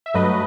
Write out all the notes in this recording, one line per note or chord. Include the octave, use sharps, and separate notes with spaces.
E5
G2 F#3 A3 B4 D#5